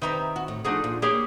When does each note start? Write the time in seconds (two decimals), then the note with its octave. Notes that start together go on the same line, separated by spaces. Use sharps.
0.02 D#3 C4 G4 B4 E5 A#5
0.36 F#4
0.48 A2
0.65 F3 A3 D4 D#4 F#4 G#4
0.84 A#2 F3
1.02 A#3 G4 G#4 C#5